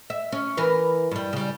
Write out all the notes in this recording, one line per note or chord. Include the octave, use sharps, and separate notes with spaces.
E5
C#4
E3 A#4 B4
G2 G3
C#3 G3